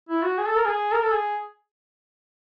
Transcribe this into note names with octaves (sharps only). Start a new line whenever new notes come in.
E4
F#4
G#4
A4
A#4
G#4
A#4
A4
G#4